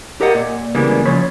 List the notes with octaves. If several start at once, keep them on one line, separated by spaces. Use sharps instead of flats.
G4 A#4 D#5 F#5
A#2
C#3 E3 G3 G#3 A#3 B3
C#3 F3 C#5 B5